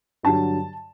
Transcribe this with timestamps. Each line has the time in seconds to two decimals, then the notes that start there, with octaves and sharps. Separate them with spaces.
0.23 G2 D3 F#3 A5